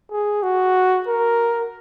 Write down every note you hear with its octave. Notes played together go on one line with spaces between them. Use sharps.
G#4
F#4
A#4